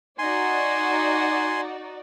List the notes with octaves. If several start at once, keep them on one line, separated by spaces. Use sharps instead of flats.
D#4 F#4 D5 G#5 C6